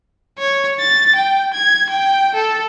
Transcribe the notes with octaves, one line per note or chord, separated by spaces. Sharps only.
C#5
A6
G5
G#6
G5
A4